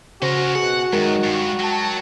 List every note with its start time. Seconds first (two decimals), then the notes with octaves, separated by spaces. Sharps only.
0.22 C#3 C#4 F#4 A#4 C5
0.56 B2 G#4 F#5
0.93 F#2 D#3 G#3 A#4
1.24 G2
1.59 F#3 G5 A5